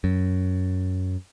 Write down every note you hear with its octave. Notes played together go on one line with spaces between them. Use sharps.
F#2